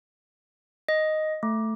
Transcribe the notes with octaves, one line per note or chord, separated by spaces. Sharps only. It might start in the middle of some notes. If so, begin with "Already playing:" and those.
D#5
A3